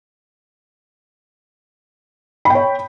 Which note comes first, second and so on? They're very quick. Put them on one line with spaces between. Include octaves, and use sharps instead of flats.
B5 G5 C#5